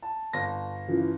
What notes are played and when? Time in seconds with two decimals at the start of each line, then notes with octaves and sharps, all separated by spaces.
0.02 A5
0.33 G1 A#6
0.88 C#3 E3 F3